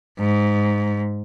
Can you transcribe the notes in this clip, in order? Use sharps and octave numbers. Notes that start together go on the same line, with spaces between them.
G#2